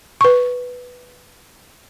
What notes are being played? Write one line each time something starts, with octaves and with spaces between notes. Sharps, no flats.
B4 C#6